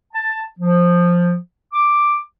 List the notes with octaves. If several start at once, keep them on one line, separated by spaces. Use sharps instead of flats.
A5
F3
D6